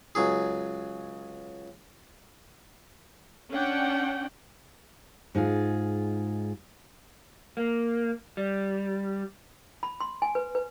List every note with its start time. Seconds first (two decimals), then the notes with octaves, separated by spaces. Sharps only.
0.15 C#2 F#3 G#4
3.53 C#4 D4 F#5 G5
5.35 G#2 D#4 F4 G#4
7.57 A#3
8.37 G3
9.83 B5
10.00 C6
10.22 G#5
10.35 B4
10.55 B4